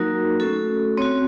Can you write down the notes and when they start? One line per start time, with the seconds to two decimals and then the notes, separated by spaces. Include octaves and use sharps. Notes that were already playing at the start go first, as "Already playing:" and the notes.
Already playing: F#3 A#3 D#4 F#4 A#4
0.40 A3 C#4 F#4 A4
0.97 C4 F#4 C#5